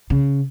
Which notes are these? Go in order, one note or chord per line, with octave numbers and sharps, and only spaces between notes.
C#3